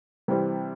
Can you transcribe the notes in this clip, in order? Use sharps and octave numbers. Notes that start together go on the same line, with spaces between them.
C3 E3 G3 C4